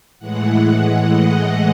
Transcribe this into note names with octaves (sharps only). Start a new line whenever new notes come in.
A2 E3 G#3 F#5
D#5